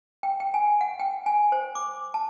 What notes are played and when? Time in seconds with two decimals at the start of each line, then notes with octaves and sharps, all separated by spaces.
0.23 G5
0.40 G5
0.54 G#5
0.81 F#5
0.99 G5
1.26 G#5
1.52 C5
1.75 D6
2.14 A5